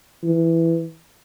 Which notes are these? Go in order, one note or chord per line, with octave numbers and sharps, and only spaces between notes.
E3